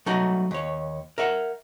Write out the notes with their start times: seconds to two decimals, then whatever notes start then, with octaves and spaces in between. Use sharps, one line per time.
0.06 F#3 G3 A3 D#4 F#4
0.51 D#2 C#5
1.18 A#4 E5 F#5